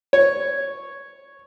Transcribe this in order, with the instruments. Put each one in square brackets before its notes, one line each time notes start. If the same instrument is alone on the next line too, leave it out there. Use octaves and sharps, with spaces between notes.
[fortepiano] C#5